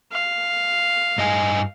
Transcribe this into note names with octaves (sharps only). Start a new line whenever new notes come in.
F5
G2 D#5 G#5